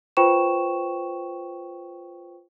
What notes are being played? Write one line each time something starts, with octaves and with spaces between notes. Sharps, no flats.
F4 B4 C5 G5 C#6 E7